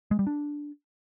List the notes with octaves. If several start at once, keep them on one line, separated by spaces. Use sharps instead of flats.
G#3
G3
D4